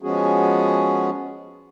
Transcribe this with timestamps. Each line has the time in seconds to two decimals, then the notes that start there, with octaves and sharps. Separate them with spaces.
0.02 F3 G#3 B3 C#4 F#4 G#4